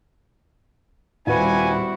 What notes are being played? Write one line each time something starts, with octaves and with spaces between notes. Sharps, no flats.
D#1 G3 C4 E4 F#4 B4 G#5